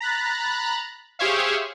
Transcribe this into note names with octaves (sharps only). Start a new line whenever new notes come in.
A#5 B5 F#6 A6
G4 G#4 C5 C#5 E5 F5